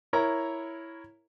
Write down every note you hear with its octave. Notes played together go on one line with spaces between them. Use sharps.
E4 A#4 C#5 A#5